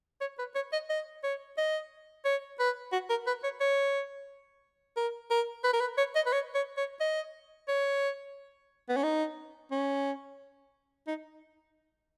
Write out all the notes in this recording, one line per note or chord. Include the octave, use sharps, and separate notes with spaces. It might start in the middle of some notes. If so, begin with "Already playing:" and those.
C#5
B4
C#5
D#5
D#5
C#5
D#5
C#5
B4
F#4
A#4
B4
C#5
C#5
A#4
A#4
B4
A#4
B4
C#5
D#5
B4
C#5
C#5
C#5
D#5
C#5
B3
C#4
D#4
C#4
D#4